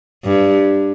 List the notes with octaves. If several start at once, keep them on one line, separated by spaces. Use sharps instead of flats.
G2